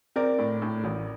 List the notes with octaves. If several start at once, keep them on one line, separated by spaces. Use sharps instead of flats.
C4 A#4 D5
A2
A2
A1